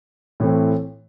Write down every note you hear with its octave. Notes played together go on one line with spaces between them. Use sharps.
A2 E3 A3 C4